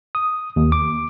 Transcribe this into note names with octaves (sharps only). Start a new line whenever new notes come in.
D#6
D#2
D6